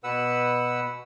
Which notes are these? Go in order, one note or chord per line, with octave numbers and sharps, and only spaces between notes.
B2 B4 F#5 E6